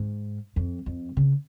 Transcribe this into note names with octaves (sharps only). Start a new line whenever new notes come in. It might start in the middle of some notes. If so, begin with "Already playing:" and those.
Already playing: G#2
F2
F2
C#3